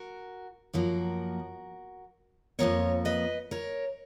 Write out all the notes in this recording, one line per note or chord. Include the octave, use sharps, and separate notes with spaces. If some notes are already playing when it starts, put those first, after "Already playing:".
Already playing: F#4 A#4
F#2 F3 A#3 F#4 A#4
F2 C#3 F3 A#3 A#4 C#5
B4 D#5
A#4 C#5